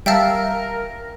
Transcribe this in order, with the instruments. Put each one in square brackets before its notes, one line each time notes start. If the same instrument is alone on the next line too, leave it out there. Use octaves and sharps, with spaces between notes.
[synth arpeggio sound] G3 E5 A5 [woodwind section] A#4 [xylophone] F5 G5